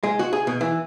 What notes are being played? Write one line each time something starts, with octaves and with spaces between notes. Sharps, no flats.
G#3
F#4
G#4
B2
E3